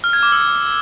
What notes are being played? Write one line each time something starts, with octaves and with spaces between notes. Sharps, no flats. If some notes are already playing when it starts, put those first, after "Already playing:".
F6
G#6
D6
E6